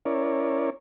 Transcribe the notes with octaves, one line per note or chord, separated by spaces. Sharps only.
C#4 E4 A#4 C#5 D5